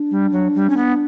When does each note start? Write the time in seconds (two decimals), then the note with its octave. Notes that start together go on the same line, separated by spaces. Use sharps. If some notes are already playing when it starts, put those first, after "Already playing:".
Already playing: D4
0.11 G3
0.32 F#3
0.55 G3
0.70 C#4
0.77 B3